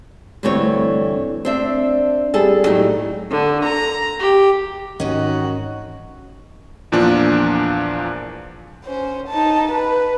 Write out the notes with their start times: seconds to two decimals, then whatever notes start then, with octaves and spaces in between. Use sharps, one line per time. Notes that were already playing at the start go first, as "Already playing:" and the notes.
0.43 D2 G2 E3 A3 C4 C#5
1.45 C4 D4 E5
2.34 G3 G#4 A4
2.64 A2 F#3 A3 D#4 G4
3.31 D3
3.65 A#5
4.19 G4
5.00 G#2 D#3 E3 C#4 F#4 D#5
6.92 E2 A#2 F3 D4
8.85 C#4 C5
9.28 D#4 A5
9.71 B4